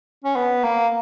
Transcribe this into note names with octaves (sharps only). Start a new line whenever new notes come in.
C#4
B3
A#3